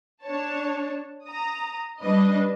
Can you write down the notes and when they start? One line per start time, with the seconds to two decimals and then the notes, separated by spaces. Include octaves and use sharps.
0.24 D4 C#5 A5
1.27 A#5 D#6
2.00 G3 D4 B4 D#5